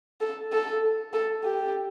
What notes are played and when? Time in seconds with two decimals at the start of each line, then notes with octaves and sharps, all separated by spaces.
0.21 A4
0.52 A4
1.13 A4
1.44 G4